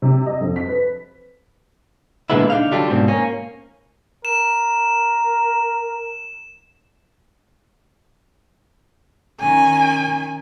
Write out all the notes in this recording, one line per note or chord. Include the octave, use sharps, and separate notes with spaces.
C3
D#5
F2
B6
B4
A#2 D3 E3 G#3 B3 E4
D4 D#4 F5
D3 F#3 G3 D4 F4 A4
G#2 B2 C4
A#3 C#4
A#4 E7
D#3 C#4 G#5